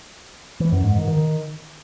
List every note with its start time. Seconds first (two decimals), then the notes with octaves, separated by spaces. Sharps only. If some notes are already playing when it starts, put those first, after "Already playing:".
0.60 E3
0.72 F#2
0.84 G#2
0.96 D#3
1.08 D#3